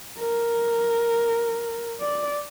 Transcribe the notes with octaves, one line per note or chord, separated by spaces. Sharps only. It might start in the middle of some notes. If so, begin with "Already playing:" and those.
A#4
D5